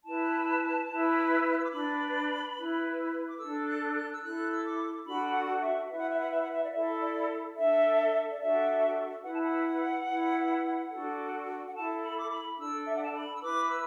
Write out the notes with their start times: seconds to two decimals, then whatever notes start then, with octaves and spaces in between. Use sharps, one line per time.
0.04 E4 B4 A5
0.88 E4 B4
1.50 F#6
1.57 E6
1.64 D6
1.71 D4 B4 B5
2.54 E4 B4
3.29 D6
3.39 D4 A4 E6
3.67 F#6
3.94 F#6
4.13 E6
4.22 E4 A4 F#6
4.52 E6
4.64 D6
5.05 D4 F#4 A4 B5
5.34 F#5
5.61 E5
5.89 E4 B4 E5
5.99 F#5
6.10 E5
6.20 F#5
6.31 E5
6.41 F#5
6.51 E5
6.63 D5
6.73 E4 A4 E5
7.00 D5
7.57 D4 A4 E5
8.32 D5
8.40 D4 F#4 A4 E5
9.24 E4 B4 F#5
9.34 A5
9.43 F#5
10.07 E4 B4
10.91 D4 F#4 A4
11.67 F#5
11.74 E4 A4 A5
12.02 B5
12.18 D6
12.31 B5
12.58 D4 A4 E6
12.85 E5
12.95 F#5
13.04 A5
13.14 B5
13.35 E6
13.41 E4 B4 D6
13.65 D6
13.69 E6